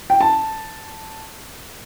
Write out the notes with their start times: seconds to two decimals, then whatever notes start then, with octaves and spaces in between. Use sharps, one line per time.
0.10 G5
0.21 A5